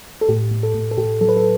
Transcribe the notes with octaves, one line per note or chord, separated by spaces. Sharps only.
A4
A2 G4
A2
A4
A2
A4
A2 G4
F#3 A4
B4
A4